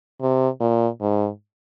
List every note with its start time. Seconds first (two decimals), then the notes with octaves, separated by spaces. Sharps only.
0.21 C3
0.60 A#2
1.01 G#2